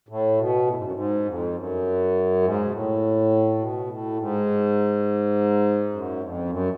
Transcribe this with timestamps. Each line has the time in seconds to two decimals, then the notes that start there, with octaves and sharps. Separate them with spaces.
0.09 A2
0.38 B2
0.67 A2
0.75 G#2
0.84 F#2
0.92 G#2
1.25 F2
1.54 F#2
2.42 G#2
2.64 B2
2.71 A2
3.59 B2
3.87 A2
4.17 G#2
5.91 F#2
6.20 F2
6.48 F#2